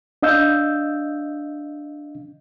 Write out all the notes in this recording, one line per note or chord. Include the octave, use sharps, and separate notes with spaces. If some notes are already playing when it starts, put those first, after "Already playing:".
D4 D#5 F5 E6 G6